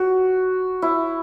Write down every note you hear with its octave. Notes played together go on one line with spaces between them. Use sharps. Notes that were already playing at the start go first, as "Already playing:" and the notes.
Already playing: F#4
E4